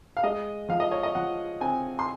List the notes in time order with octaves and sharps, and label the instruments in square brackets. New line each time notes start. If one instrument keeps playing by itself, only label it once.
[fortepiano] F5
G#3 D#5
F3 F5
D#5
C#5
D#5
F3 F#5
C4 G#5
C6